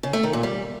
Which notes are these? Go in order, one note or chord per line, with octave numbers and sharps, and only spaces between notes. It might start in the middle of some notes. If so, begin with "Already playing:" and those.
C#3
A3
D#3
A#2
G3